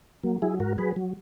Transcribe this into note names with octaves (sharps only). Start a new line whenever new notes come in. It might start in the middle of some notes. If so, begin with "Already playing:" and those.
F#3 A#3
F#3 E4 G#4
G#2 F#4 A#4
F#3 G#4 B4
F#3